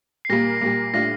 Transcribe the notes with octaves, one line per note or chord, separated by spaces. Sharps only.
C7
A#2 G3 A#3 A#6
A#2 G3 A#3
A2 G3 D4 F4 A#6